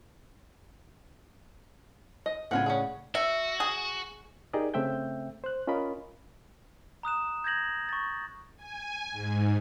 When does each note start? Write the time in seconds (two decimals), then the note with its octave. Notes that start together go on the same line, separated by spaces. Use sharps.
2.26 D#5
2.51 A2 C#3 E3 F4 F#5 G#5
2.66 C#4 D4 G#4
3.15 F#4 E5
3.60 G#4
4.53 D#4 G4 G#4 A#4 D5 D#5
4.74 C#3 A3 C4 E5 G5 G6
5.44 C5 F#6
5.67 C#4 F4 A#4 D#5 B5
7.03 A#5 D#6 F#6 E7
7.44 G6 G#6 A#6 F#7
7.89 C#6 A6
8.57 G#5
9.11 G#2